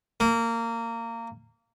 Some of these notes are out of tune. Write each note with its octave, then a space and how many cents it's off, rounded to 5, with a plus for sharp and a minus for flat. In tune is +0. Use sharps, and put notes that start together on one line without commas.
A#3 -20